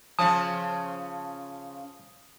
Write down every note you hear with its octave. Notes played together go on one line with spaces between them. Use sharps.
C#3 F3 C#4 A5 D#6